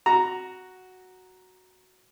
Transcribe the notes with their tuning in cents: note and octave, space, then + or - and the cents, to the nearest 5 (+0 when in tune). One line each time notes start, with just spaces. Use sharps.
F#4 +0 A#5 +0